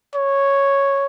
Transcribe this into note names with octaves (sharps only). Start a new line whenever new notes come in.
C#5